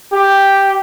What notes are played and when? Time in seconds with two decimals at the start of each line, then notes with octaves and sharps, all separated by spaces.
0.12 G4